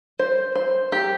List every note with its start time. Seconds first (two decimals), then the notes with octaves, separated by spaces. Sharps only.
0.19 C5
0.55 C5
0.92 G4